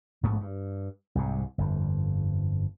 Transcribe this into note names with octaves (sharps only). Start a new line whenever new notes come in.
A#1 G#2 A3 B3
G2
C2 G#2 C3
G1 F2